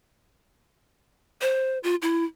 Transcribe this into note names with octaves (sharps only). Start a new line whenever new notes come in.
C5
F4
E4